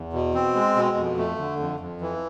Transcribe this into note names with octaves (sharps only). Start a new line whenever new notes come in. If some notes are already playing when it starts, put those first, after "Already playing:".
Already playing: E2
B2
C4
G#3
B2
F2
A3
D3
F2
F2
E3